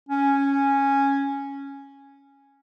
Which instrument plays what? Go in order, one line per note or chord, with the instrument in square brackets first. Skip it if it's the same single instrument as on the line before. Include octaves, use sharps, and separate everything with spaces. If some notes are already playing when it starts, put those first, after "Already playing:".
[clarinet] C#4